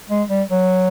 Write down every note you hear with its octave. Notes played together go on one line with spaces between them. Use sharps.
G#3
G3
F#3